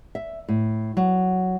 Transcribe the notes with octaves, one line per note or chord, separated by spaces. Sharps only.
E5
A2
F#3